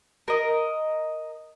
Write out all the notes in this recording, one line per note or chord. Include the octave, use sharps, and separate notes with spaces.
A#4 D#5